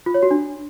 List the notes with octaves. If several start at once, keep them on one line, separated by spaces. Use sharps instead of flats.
F4
C#5
F#4
D4